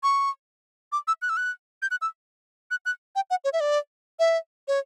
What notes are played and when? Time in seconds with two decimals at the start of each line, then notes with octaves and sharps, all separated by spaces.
0.03 C#6
0.92 D6
1.08 E6
1.22 F#6
1.29 E6
1.37 F#6
1.82 G6
1.91 F#6
2.02 E6
2.71 F#6
2.86 F#6
3.16 G5
3.30 F#5
3.44 C#5
3.53 E5
3.60 D5
4.19 E5
4.68 C#5